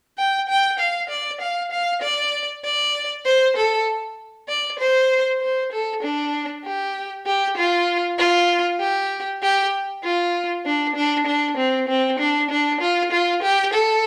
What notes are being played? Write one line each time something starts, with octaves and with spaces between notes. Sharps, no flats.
G5
G5
F5
D5
F5
F5
D5
D5
C5
A4
D5
C5
C5
A4
D4
G4
G4
F4
F4
G4
G4
F4
D4
D4
D4
C4
C4
D4
D4
F4
F4
G4
A4